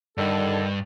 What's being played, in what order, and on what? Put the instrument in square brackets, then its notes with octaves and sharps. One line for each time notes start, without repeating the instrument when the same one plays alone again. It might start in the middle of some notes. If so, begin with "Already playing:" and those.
[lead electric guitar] G2 [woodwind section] D3 D#3 A4